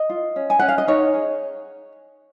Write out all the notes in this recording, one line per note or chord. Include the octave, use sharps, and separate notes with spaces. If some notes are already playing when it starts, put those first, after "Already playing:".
Already playing: D#5
F4
C#4
G#5
C#4 F#5
F5
D#5
D#4 C#5
G#4